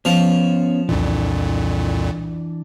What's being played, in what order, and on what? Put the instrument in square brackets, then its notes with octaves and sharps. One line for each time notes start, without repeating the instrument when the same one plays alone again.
[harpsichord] F3 [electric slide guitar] B3 C#4
[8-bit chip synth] C2 F2 A#2 [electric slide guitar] E3 D4